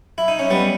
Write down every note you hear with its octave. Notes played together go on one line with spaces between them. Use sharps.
E4
D#4
C#4
G3 B3